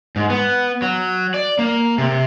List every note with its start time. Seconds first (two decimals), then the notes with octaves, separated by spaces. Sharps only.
0.16 G#2
0.30 B3
0.82 F#3
1.34 D5
1.59 A#3
1.98 C3